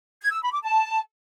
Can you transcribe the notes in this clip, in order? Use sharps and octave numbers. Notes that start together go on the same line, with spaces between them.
G#6
E6
B5
D6
A5